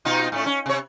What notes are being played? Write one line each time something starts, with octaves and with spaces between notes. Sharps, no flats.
B2 D#4 F4
A2 A3 C#4
C#4
C3 C#5